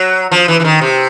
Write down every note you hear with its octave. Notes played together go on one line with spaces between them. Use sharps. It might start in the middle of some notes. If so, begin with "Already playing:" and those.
Already playing: F#3
F3
E3
E3
D#3
C3